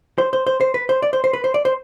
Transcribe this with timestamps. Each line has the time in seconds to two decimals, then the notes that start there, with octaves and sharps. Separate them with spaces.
0.18 C5
0.33 C5
0.47 C5
0.61 C5
0.74 B4
0.89 C5
1.02 D5
1.13 C5
1.24 C5
1.33 B4
1.44 C5
1.54 D5
1.65 C5